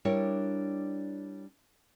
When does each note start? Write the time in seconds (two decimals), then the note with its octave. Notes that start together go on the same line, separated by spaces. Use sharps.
0.05 G3 D4 E4 A#4 C#5